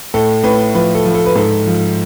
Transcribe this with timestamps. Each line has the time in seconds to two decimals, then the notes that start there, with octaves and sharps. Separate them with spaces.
0.14 A2 A4
0.44 A2 B4
0.74 F3 B4
0.95 A4
1.05 F3
1.14 A4
1.26 B4
1.36 G#2 A4
1.66 F3